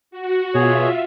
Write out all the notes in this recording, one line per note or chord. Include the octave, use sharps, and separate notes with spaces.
F#4
B2 F4 G#4 C#5 E5